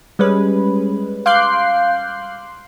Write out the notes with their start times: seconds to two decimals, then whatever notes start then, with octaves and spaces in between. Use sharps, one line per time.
0.19 G3 G#3 C#4 B4
1.26 F5 C6 D6 F#6 G6 C7